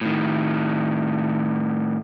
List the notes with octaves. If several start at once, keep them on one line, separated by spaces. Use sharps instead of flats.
A2 D#3